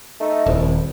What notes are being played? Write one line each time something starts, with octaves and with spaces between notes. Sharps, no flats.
A3 D#4
D#1 C2